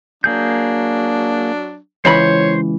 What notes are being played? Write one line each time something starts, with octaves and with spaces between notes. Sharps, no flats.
F#3 A#3 D4 G#4 G6
C#2 E3 C5 C#5 B5